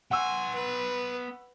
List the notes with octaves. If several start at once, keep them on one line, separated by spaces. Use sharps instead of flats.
B3 F#5 G#5 C6 C#6 E6
B4